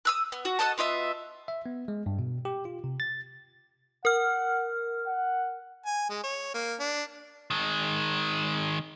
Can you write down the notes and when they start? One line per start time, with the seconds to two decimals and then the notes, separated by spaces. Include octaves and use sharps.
0.05 D#6 E6 F#6
0.32 B3
0.45 F#4
0.59 A4 D#5 F#5 A5
0.78 B3 F4 D#5 E5
1.48 E5
1.66 B3
1.88 G#3
2.06 G2
2.19 B2
2.45 G4
2.65 F4
2.84 C3
3.00 A6
4.05 A#4 F#5 F6
5.07 F#5
5.86 G#5
6.09 G#3
6.23 C#5
6.54 A#3
6.79 D4
7.50 D#3 G#3